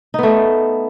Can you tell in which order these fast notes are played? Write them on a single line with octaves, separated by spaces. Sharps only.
D#4 B3 A3